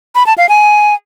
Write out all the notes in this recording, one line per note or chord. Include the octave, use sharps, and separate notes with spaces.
B5
A5
F5
G#5